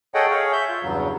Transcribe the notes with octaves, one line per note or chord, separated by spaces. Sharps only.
G#4 A4 C#5 D#5 F#5 G5
G#4 C#5 F5
E5 G6
F4
E2 G2 C#3 F#3